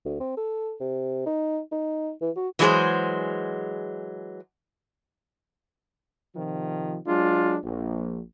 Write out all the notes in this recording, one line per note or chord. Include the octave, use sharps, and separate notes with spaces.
D2
C4
A4
C3
D#4
D#4
E3
F#4
E3 F#3 G#3 D#4 G#4 C5
C3 D#3 F3
F#3 G#3 D4 F4
A#1